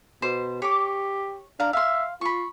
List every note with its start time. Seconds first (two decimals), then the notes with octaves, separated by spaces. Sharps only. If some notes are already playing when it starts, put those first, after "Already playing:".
0.22 B2 C5
0.62 G4 C#5 D6
1.60 D4 F5 A#5
1.73 E5 F5 C6
2.21 F4 B5 C#6